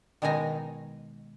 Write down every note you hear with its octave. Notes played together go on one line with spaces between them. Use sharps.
B2 D#3 G#3 D#4 G#5 A#5